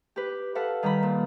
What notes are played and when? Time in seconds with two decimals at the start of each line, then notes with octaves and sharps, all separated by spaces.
0.16 G4 B4
0.55 A4 B4 F5 F#5
0.83 D#3 G3 A#5 B5
1.03 A#2